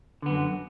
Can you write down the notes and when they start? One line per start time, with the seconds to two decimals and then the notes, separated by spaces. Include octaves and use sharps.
0.22 D3
0.26 B3
0.30 F#2
0.33 F#3